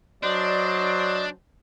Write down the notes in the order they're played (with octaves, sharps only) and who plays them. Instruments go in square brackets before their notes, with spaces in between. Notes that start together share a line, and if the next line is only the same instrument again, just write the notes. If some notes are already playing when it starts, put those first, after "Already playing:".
[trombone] F#3 [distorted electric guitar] D4 [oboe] C5 [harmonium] D5 D#5